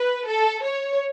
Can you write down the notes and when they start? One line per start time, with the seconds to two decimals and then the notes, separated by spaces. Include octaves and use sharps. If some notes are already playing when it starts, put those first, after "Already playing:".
Already playing: B4
0.28 A4
0.65 C#5